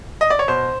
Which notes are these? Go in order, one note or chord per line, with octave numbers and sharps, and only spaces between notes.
D#5
D5
C#5
B2 C5